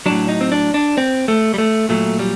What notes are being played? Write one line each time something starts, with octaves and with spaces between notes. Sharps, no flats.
A2 F#3 D4
D#4
C4
D4
D4
C4
A3
G3
A3
A#2 F#3 A3
G3